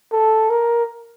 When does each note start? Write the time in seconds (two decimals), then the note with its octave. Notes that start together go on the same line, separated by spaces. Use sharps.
0.12 A4
0.50 A#4